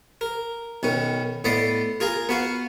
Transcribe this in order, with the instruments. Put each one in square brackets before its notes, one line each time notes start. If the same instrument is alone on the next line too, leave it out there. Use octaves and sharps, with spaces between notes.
[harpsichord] A#4
B1 D#3 C#4
A2 B3 D5 D#5 C6
F4 G#4 A#4 A#5
B3 F#4 F5